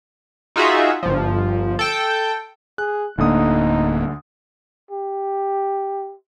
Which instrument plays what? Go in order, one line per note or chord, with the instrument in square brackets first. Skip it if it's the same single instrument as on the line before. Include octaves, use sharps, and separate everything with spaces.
[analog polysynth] D#4 F4 F#4 G#4 E5
G1 F3
A4 G5
[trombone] G#4 [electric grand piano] F#6
[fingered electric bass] D1 A#3 [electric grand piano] D2 D3 D#6 [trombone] D#4
[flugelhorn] G4